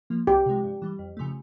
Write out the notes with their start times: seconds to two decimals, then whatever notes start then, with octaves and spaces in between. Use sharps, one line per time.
0.10 F3 A#3
0.27 C2 G4
0.46 C3 F3 G#3
0.64 G2
0.82 E3 G3
0.99 F2
1.17 C#3 F3 A3